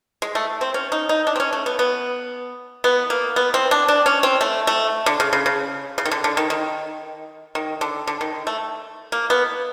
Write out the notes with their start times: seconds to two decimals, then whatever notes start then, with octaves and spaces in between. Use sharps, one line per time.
0.22 G#3
0.35 A3
0.61 C4
0.74 C#4
0.92 D#4
1.09 D#4
1.27 D4
1.36 C4
1.40 C#4
1.53 A3
1.66 B3
1.79 B3
2.84 B3
3.10 A#3
3.36 B3
3.54 C4
3.71 D4
3.88 D4
4.06 C#4
4.23 C4
4.41 A3
4.67 A3
5.06 D3
5.20 C#3
5.33 C#3
5.46 C#3
5.98 C#3
6.05 D#3
6.11 D3
6.24 D3
6.37 D#3
6.50 D#3
7.55 D#3
7.81 D3
8.07 D3
8.21 D#3
8.47 A3
9.12 A#3
9.30 B3